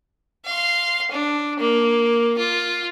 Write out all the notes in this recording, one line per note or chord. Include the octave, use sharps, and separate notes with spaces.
F5 C6
D4
A#3
F4